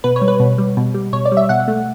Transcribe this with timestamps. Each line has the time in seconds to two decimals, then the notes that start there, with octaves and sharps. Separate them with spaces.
0.04 B2 B4
0.16 C#5
0.22 G3
0.28 B4
0.40 B2
0.58 G3
0.77 B2
0.94 G3
1.13 B2 C#5
1.25 D5
1.32 G3
1.37 E5
1.49 B2 F#5
1.68 A3